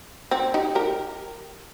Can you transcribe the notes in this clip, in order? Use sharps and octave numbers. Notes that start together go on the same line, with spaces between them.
C4 D#4
D#4 G4
G4 A#4